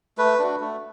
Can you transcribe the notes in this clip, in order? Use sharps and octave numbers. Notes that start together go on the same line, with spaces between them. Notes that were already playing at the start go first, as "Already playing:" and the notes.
A3 B4
D4 F#4
A3